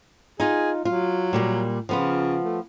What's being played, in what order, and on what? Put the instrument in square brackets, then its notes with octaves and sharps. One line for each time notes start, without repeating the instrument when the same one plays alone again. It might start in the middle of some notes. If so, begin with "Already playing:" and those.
[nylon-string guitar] D#4 F4 [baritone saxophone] G#4
[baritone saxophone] F#3 [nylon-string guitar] F4
[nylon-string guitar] A#2 G3 A#3
[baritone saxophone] C#3 [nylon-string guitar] F3 B3 F4
[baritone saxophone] A3